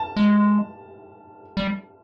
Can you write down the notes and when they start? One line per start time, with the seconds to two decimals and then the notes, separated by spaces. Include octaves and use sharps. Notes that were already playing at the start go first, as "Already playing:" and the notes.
Already playing: A5
0.16 G#3
1.57 G3